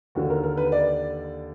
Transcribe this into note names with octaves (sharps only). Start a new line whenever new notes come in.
D#2 D3 F#4
A#4
A#4
B4
D5